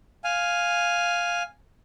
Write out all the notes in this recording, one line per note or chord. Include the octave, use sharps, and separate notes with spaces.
F5 G#5